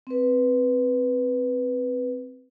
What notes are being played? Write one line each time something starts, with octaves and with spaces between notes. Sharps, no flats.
C4 B4